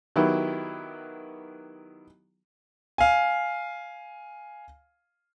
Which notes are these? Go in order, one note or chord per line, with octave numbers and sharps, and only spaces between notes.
D#3 F#3 B3 E4 G4
F5 G#5